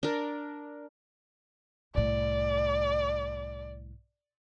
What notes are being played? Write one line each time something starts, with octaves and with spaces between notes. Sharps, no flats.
D4 A#4
C2 A2 D5